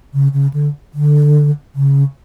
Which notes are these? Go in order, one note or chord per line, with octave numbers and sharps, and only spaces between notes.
C#3
C#3
D3
D3
C#3